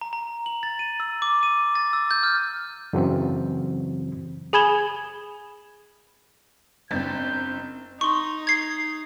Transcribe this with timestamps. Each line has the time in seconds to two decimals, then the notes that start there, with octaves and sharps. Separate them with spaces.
0.01 A#5
0.13 A#5
0.46 F#7
0.63 A6
0.79 D#7
1.00 E6
1.22 D6
1.43 D#7
1.75 A6
1.93 E6
2.11 G6
2.23 F6
2.93 F#2 C#3 E3 F#3 C4
4.53 G#4 G#5 B5 G#6 E7 G7
6.91 F#1 C4 D4 G6 A6
8.01 D#4 C6 C#6
8.47 G#6 C7